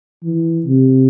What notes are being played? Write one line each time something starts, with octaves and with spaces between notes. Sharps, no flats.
E3
C3